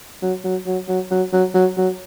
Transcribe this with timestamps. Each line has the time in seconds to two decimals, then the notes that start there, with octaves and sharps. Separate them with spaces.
0.22 F#3
0.44 F#3
0.67 F#3
0.88 F#3
1.11 F#3
1.33 F#3
1.54 F#3
1.77 F#3